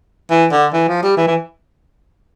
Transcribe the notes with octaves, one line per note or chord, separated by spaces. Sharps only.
E3
D3
E3
F3
G3
E3
E3